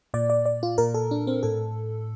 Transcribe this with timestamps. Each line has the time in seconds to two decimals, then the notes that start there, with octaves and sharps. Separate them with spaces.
0.14 A#2 D5
0.30 D5
0.45 D5
0.63 F4
0.78 A#2 A#4
0.94 A4
1.11 D4
1.27 C4
1.43 A2 A4